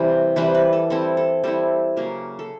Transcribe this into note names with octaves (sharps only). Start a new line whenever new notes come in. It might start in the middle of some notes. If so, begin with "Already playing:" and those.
Already playing: C3 E3 G3
C3 E3 G3 B4
B4
A4
G3 C4 E4 A4
A4
G3 C4 E4 A4
C#3 F#3 A#3
A4